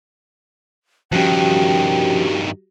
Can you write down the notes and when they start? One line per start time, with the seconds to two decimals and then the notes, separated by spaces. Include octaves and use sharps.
1.12 G2 D#3 F3 C#4 F#4 G4 G5